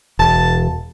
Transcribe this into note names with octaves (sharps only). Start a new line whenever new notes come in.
E1 A5